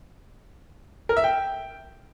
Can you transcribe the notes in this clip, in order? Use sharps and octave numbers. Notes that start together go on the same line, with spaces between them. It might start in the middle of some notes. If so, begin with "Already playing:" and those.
A#4
E5
G5